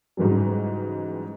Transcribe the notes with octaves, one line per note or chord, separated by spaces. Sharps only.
G#2 C#3 E3 F#3 G3